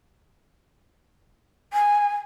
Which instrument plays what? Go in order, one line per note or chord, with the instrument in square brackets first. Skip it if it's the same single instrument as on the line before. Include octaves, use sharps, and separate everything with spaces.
[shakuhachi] G#5